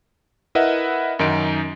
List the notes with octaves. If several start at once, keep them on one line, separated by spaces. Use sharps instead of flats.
E4 A#4 B4 D#5 E5 F#5
F#2 D#3 D#4 D7